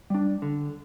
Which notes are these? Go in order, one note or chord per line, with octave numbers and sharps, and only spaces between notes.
G3 D4
D3